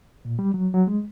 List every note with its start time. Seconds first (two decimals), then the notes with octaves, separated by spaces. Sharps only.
0.25 A#2
0.39 G3
0.54 F#3
0.74 F#3
0.87 G#3